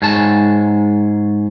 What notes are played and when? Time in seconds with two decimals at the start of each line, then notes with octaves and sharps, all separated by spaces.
0.02 G#2 G#4 C#5 A5